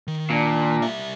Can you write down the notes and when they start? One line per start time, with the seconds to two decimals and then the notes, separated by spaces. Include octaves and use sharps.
0.08 D#3
0.30 A#2 D4
0.82 G3 E5